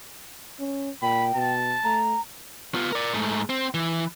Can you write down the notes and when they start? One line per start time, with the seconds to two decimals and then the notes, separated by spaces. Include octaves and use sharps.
0.60 C#4
1.02 A#2 G5 B5
1.35 B2 A5
1.84 A3 A#5
2.75 B3 F4
2.93 A#4 D5
3.14 G#2 A3
3.50 C4
3.74 E3